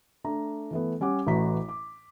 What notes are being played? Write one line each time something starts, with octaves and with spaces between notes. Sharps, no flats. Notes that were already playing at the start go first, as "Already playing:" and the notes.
A3 D4 A#5
E3 A3 B3
G3 C#4 G4 F#5 D6
A1 A2 E3 F#4 A#5 B6
D6